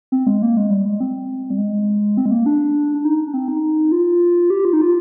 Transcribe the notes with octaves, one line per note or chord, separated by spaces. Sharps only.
C4
G#3
A#3
G#3
G3
G#3
C4
G3
G#3
C4
G#3
A#3
D4
D4
D#4
D4
C4
D#4
F4
G4
F4
D#4
F4